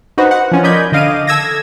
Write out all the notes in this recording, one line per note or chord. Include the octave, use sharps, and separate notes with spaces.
D#4 F#4 B4 C5
F#5
F3 C#4 F4
A#4 D5 D#5 B5 G6 G#6
D3 D#5 F5 D6 D#7
A4 E6 G#6 A#6